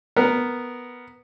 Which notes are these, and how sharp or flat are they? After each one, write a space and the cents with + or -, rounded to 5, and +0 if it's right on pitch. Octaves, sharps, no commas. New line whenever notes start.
B3 +0 A#4 +0